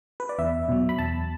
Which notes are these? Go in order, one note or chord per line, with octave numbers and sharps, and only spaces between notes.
B4
D5
E2 E5
B2 F#3
B5
E2 A5